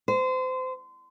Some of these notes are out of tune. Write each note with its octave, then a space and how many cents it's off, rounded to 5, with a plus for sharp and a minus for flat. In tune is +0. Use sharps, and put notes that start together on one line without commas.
C5 -30